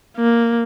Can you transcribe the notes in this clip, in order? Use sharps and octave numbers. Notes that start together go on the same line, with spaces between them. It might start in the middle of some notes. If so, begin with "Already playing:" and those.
A#3